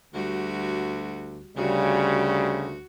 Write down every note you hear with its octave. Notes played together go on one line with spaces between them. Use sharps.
D2 G3 F#4
D2 C#3 G3 F#4